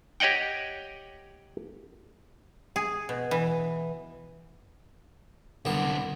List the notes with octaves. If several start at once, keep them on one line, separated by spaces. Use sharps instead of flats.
G4 C#5 D#5 F#5 G5
G#4
B2
E3
C2 F#2 D3 B3